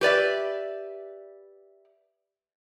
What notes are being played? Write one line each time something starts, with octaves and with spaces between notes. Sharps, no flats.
G4 B4 D5 E5